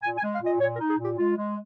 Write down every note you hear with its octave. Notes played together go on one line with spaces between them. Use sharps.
A#2 G#5
G#5
G#3
F5
A#2 D#5
A#2 C#5
A#4
D#4
G#4
A#2
G4
G#3 F4
G#3